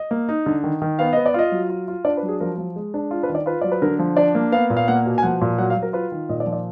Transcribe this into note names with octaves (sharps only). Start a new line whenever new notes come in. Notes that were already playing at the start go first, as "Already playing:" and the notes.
Already playing: D#5
A#3
D#4
D3
D#3
D#3
B3 F5
B3 D#5
D5
F4 D#5
F#3
F4
F4
D4 D5
B4
F#3
G#4
F3 A#4
F3
G#3
D4
F4
B4
D#3
D5
F4 B4
F#3 D5
B4
D3 A#4
F3
D4 D5
A#3
B3 F5
A#2
F5
A#3 F#5
B2
G#5
F3 F#5
A#2
F#3 F#5
F5
F#3
A#4
F4 B4
D#3
A#2 D#5
D5
F3
D5